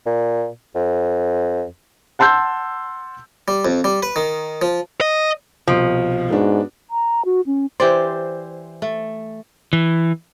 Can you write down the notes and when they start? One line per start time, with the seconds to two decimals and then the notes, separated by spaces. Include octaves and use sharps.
0.06 A#2
0.75 F2
2.19 F#5 A5 C6 E6 G6
3.48 G3
3.65 F2
3.84 G3
4.03 B4
4.16 D#3
4.62 F3
5.01 D#5
5.68 C2 B2 F3 D7
6.30 G#2 B3 D4 F#4
6.90 A#5
7.25 F#4
7.46 C#4
7.80 E3 G4 C5 D5
8.82 A3
9.73 E3